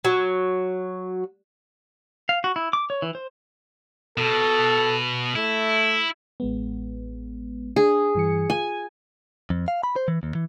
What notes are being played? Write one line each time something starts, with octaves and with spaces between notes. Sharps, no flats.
F#3
F5
F#4
E4
D6
C#5
E3
C5
B2 A4
A3 E4
A1 G#3 B3
D4 G#4
G2 E3 C#7
F4 G#5
F2
F5
B5
C5
E3
D#2
E3